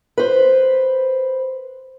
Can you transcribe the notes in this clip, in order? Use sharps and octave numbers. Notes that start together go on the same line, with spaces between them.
B4 C5